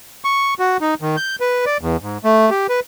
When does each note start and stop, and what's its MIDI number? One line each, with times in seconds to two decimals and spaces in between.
0.25 0.54 85
0.59 0.77 66
0.81 0.94 63
1.01 1.16 51
1.17 1.36 91
1.40 1.65 71
1.66 1.77 74
1.81 1.97 40
2.02 2.18 44
2.24 2.50 57
2.50 2.67 67
2.69 2.80 71